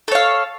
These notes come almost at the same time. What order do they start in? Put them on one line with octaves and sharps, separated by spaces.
A4 C#5 F5